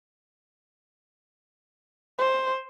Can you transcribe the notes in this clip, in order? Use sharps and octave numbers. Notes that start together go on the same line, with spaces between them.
C5